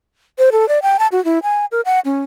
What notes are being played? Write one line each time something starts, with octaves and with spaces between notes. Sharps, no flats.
C5
A4
D5
G5
A5
F#4
E4
G#5
A#4
F#5
C#4